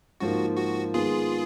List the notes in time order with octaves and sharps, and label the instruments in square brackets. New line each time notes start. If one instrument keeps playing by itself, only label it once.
[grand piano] G#2 F3 A#3 [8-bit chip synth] F#4
[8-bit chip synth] F#4
[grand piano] D#3 G#3 B3 [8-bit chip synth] F4 G#4